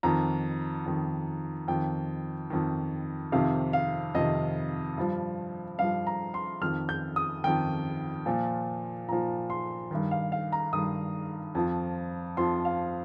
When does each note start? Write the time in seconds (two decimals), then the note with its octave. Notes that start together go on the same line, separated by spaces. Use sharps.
0.03 F2 D#3 A#5
0.86 F2 D#3
1.68 F2 D#3 G5
2.50 F2 D#3
3.32 F2 C3 D#3 F5
3.73 F5
4.15 F2 C3 D#3 D#5
4.98 G2 F3
5.79 G2 F3 F5
6.07 A#5
6.34 C6
6.61 F2 D#3 F6
6.89 G6
7.16 D#6
7.44 F2 D#3 G5
8.26 A#2 F3
9.08 A#2 F3 A#5
9.50 C6
9.91 G2 D#3
10.11 F5
10.32 F5
10.52 A#5
10.73 G2 D#3 D#6
11.55 F2 F3
12.37 F2 F3 C6
12.65 F5